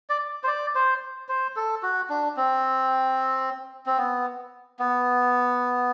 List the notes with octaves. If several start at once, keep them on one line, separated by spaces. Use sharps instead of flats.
D5
C5
D5
C5
C5
A4
F#4
D4
C4
C4
B3
B3